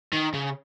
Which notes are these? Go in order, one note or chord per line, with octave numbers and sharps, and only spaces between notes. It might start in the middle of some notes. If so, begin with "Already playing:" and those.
D#3
C#3